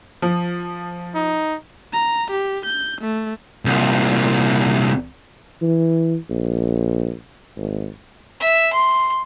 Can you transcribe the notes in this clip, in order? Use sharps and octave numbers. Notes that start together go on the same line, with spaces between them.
F3
D#4
A#5
G4
G6
A3
C2 A#2
E3
A#1
G#1
E5
C6